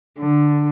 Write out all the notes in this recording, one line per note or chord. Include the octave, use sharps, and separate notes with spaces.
D3